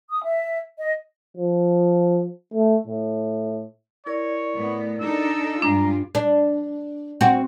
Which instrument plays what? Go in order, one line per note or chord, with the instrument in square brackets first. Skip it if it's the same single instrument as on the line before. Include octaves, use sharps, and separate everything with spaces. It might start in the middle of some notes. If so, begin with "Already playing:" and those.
[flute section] D#6
E5
D#5
[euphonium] F3
A3
A2
[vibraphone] E4 A#4 D5 [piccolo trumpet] C#5
[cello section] A2 B3
[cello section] D4 D#4 A4 [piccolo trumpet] E6
[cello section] G2 G3 F4 [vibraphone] G#3 [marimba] D4 [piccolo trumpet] A#5
[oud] D4
C4 F#4